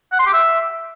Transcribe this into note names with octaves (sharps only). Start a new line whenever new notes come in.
F#5
C6
G4
E5